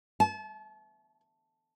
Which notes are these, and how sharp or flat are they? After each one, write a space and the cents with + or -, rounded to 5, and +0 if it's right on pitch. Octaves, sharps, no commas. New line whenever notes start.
A5 -35